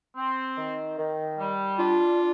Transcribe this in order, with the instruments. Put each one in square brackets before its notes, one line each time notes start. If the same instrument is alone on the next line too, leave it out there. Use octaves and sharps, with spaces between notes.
[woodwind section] C4
D#3
D#3
G3
[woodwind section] D4 [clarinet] F4